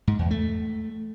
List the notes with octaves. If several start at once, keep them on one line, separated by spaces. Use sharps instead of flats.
G#2
E2
A3